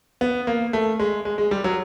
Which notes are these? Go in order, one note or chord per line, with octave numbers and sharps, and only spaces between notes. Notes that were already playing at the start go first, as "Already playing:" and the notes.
B3
A#3
A3
G#3
G#3
G#3
G3
F#3